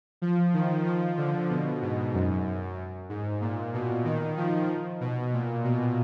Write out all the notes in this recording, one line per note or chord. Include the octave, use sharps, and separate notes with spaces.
F3
D#3
F3
D3
B2
G#2
F#2
G#2
A#2
B2
D#3
F3
B2
A#2
B2